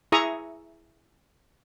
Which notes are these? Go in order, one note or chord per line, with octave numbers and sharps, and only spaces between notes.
E4 G#4 E5 A#5 C#6 D#6